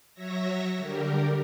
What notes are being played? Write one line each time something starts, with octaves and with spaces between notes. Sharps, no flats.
F#3 C#5 E5 A#6
D3 G3 G4 A#4